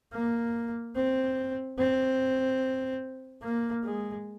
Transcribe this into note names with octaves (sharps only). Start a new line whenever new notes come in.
A#3
C4
C4
A#3
G#3